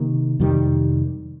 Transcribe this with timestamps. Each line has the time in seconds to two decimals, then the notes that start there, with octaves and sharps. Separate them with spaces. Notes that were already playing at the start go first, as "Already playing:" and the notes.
Already playing: C3 D#3 A#3
0.39 F2 C3 D#3 G3